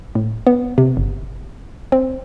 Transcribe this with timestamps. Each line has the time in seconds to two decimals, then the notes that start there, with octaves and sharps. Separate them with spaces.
0.15 A2
0.47 B3
0.78 C3
0.97 G1
1.92 C4